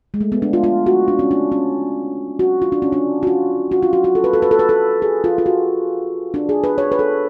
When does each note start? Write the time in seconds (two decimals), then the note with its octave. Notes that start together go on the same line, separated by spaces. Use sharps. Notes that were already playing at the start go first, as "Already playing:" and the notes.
0.14 G#3
0.21 A3
0.32 B3
0.42 D4
0.53 F4
0.64 F4
0.86 F#4
1.08 D4
1.19 C#4
1.31 D4
1.52 C#4
2.39 F#4
2.62 F4
2.72 D4
2.82 C#4
2.92 D4
3.23 F#4
3.27 F4
3.72 F#4
3.83 F4
3.93 F#4
4.04 F#4
4.15 A4
4.24 B4
4.33 A4
4.42 B4
4.51 A4
4.59 B4
4.69 A4
5.02 G#4
5.24 F4
5.38 F4
5.46 F#4
6.34 D4
6.49 G#4
6.64 B4
6.78 C#5
6.92 B4
6.99 A4